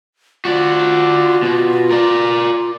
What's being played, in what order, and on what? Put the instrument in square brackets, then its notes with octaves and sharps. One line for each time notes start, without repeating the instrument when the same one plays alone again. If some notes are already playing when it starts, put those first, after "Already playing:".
[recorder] F4 [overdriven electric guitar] F#4 D5
[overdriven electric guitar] B2
A#4 D5